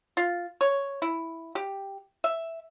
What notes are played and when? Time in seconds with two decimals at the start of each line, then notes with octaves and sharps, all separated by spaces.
0.17 F4
0.61 C#5
1.02 E4
1.55 G4
2.24 E5